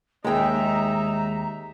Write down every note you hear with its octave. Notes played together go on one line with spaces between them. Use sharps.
D#2 G#3 D#4 E5 G5 A#5